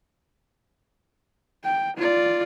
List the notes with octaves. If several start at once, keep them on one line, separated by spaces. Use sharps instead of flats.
G5
F4 D5